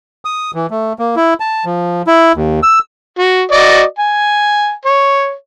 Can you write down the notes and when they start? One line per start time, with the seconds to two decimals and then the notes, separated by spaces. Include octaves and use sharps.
0.25 D#6
0.55 E3
0.71 A3
0.99 A#3
1.16 E4
1.40 A5
1.65 F3
2.07 E4
2.35 D#2
2.63 E6
3.19 F#4
3.52 F#4 D5 D#5
3.99 G#5
4.85 C#5